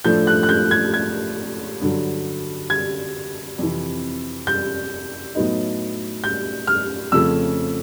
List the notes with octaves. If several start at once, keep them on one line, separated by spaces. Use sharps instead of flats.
A2 F3 A3 D4 G6
F#6
F#6
G6
G#6
G#6
G2 D3 F#3
G#6
F2 C3 E3
G6
A2 F#3 B3 D#4
G6
F6
F2 C#3 F3 A3 C#4 E6